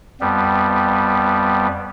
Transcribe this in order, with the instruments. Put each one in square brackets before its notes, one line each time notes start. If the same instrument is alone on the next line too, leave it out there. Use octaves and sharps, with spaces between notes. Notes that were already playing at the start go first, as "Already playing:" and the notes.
[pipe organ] F2 G3 B3